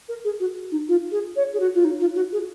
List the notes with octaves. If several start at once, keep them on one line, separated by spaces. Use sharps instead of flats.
A#4
G#4
F#4
D#4
F4
G#4
C#5
G#4
F#4
F4
D#4
F4
F#4
G#4